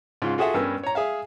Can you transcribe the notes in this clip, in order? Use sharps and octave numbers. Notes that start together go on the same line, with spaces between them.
G#2 C#3 F4
F4 F#4 G#4 A4 E5 F#5
G2 B3 C#4 A#4 E6
C#5 A#5
G#4 E5 F5